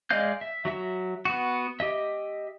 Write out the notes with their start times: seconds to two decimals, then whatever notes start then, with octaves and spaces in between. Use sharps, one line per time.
0.10 G#3 D5 D#5 F5 G6
0.41 E5
0.65 F#3 F#4 E5
1.25 B3 F#4
1.80 G4 D#5 E5